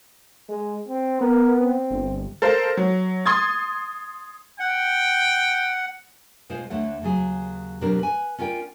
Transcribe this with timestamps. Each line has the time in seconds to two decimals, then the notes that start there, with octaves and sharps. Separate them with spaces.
0.49 G#3
0.88 C4
1.21 B3 A#4
1.60 C4
1.91 G1
2.42 A4 A#4 C5 F5
2.77 F#3
3.26 C6 D#6 G#6 A6
4.60 F#5 G5
6.50 B2 G#3 F4 C5
6.70 D2 D3 A3 C#5 F#5
7.02 D#2 C#3 F#3 G#4
7.81 B2 F#3 C4 D4 G4 A#4
7.99 B4 G#5
8.38 C#4 F4 A#4 D5 G5